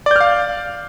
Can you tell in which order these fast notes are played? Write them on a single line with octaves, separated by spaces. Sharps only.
D5 G6 F6 F5